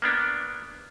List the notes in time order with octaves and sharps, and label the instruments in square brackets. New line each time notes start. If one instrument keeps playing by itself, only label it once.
[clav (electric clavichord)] A#3 B3 D4